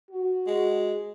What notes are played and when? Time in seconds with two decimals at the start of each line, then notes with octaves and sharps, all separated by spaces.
0.11 F#4
0.47 G#3